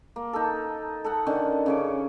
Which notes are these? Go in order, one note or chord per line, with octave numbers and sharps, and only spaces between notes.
A#3
D#4 A4
A4 D#5 F#5
D3 D#3 C#4
C#3 C#4 D6